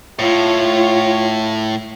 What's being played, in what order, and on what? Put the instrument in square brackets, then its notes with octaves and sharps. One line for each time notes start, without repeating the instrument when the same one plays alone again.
[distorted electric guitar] A2 [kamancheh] F4 C#5